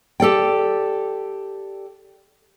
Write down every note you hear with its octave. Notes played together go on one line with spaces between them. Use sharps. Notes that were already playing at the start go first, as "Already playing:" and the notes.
G4 A4 D5 G5